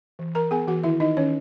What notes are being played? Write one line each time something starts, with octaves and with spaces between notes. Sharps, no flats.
E3
E3 A#4 A#5
B3 G#4 G#5
E3 F#4 F#5
D#3 E4 E5
D#3 D#4 D#5
D#3 C#4 C#5